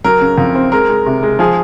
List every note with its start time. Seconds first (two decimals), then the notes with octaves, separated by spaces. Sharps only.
0.04 F#3 A#4
0.21 C#3
0.38 F2
0.55 C4
0.72 G#3 A#4
0.89 G#3
1.06 C3
1.23 G#3
1.39 F3 G#4